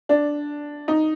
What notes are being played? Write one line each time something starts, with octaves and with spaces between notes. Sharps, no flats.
D4
D#4